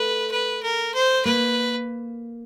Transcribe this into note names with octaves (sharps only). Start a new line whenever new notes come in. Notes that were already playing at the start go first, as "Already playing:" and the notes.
Already playing: A3 B4
B4
A#4
C5
A#3 B4